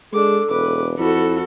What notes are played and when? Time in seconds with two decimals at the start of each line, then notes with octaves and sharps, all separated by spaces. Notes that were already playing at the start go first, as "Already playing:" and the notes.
0.13 G#3 D4 A4 D6
0.49 E1 B4 D6
0.98 F2 E4 F#4 A4 B5